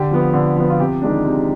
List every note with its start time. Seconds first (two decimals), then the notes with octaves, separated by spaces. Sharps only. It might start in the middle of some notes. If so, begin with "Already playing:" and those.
Already playing: D3 G4
0.11 F3 B3
0.33 D3
0.56 F3 B3
0.70 F4
0.79 C3 G4
1.02 D#3 G#3 D4
1.25 C3